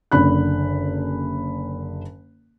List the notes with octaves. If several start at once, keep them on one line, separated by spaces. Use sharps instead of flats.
F#1 D3 B5 F#6